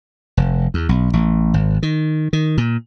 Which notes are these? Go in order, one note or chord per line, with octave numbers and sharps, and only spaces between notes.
F1
E2
B1
A1
G#1
D#3
D#3
A#2